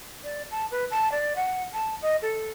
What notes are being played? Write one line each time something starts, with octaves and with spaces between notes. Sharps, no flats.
D5
A5
B4
A5
D5
F#5
A5
D#5
A4